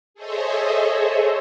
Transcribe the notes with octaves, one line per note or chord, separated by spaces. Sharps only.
G#4 A4 C5 C#5 D#5 E5